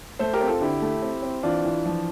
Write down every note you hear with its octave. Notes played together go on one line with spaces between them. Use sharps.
A3 A4 C5
G4 A#4
C4
F4 A4
D3 E4 G4
A3
C4
C4
E3 D4 F4
E3
F3